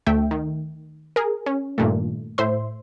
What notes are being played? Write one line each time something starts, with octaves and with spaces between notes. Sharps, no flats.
D2 A3 E5 G5
D#3
G#4 A#4
C#4
G2 A#2 D#3 A3
A2 C5 E5 C6